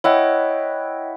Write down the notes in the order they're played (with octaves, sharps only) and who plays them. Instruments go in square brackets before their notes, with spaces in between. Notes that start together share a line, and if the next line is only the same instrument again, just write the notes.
[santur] E4 F#5 [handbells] C#5 D#5 G5